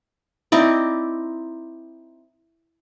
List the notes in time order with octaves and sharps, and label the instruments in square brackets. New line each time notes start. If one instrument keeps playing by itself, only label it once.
[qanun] C4 D#4 E4 D5